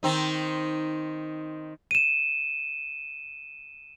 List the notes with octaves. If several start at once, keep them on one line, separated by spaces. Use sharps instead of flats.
D#3 C4 D#4
D#7 E7